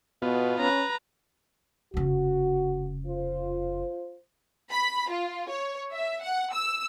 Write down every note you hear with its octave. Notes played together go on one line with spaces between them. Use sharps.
B2 B3 F4
C#4 B4 A#5
F1 C#3 F#4
F4 C5
B5
F4
C#5
E5
F#5
E6